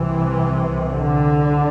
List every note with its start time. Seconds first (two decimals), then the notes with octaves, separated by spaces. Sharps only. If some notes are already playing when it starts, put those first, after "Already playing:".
Already playing: C2 C3 E3
0.88 D3